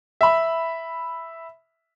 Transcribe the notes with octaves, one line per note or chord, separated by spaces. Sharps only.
E5 B5